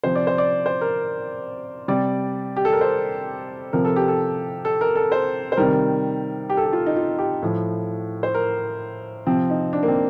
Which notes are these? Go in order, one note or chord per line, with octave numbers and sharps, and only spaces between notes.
C3 F3 C5
D5
C5
D5
C5
A#4
C3 G3 D5
G4
A4
A#4
C5
C3 F3 A#4
A4
G4
A4
A4
A#4
A4
C5
C5
C3 D#3 G3 A#4
G4
A4
G4
F4
D#4
F4
G4
A2 F3
C5
A#4
C3 F3 C4
D#4
D4
A#3
C4